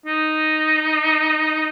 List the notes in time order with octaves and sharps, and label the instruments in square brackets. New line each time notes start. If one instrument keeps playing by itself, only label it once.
[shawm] D#4